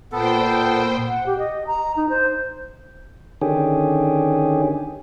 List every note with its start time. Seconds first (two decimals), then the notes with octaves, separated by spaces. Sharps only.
0.12 A#2 B3 A4 C5 G5
1.08 F#5
1.26 G4
1.39 D#5
1.67 A#5
1.96 D#4
2.09 C5
3.41 D3 D#3 C#4 G4 G#4